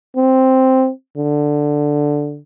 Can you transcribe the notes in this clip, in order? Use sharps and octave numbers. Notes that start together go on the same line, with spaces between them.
C4
D3